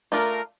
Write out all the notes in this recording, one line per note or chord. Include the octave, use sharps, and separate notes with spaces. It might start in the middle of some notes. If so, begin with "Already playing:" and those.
A3 D4 F4 A#4